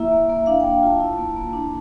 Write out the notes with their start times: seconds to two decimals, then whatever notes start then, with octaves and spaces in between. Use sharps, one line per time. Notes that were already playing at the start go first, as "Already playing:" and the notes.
Already playing: A#3 E4 E5
0.11 A#3
0.30 A#3
0.46 D4 F5
0.60 A#3 G5
0.83 F4 A5
1.00 E4
1.18 A#3
1.36 A#3
1.53 D4